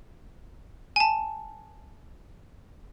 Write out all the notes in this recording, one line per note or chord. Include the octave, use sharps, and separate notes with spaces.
G#5 A5